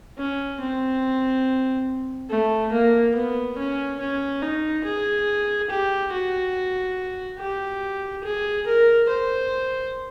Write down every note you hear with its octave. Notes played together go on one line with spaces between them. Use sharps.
C#4
C4
A3
A#3
B3
C#4
C#4
D#4
G#4
G4
F#4
G4
G#4
A#4
C5